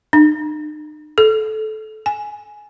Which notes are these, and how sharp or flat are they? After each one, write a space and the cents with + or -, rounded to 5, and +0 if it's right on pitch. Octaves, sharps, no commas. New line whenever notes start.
D#4 -45
A4 -20
G#5 +5